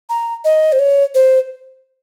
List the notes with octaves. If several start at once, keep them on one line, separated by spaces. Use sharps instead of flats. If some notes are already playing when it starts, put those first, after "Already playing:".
A#5
D#5
C5
C#5
C5